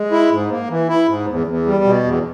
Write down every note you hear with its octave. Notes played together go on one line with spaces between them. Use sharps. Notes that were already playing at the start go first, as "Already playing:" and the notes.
Already playing: G#3
E4
G#2
A#3
E3
E4
G#2
E2
E2
G3
B2
E2